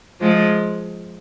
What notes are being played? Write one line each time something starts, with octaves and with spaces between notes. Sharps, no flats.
F3 G#3